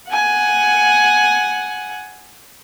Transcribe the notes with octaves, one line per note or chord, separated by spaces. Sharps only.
F#5 G#5